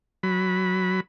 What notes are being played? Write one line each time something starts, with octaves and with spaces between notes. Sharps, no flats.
F#3 B5